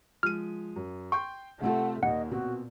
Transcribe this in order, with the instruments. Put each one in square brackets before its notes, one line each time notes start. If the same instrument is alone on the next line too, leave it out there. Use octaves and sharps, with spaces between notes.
[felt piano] F3 G#3 D#7 [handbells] F6
[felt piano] F#2
[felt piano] G5 C6 G6 [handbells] C#6
[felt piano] C3 C4 F4 [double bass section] A3 [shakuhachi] F#5
[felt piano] D#2 [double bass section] A#2 [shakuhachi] D#5 [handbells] F#5
[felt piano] B2 C4 [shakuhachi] F#4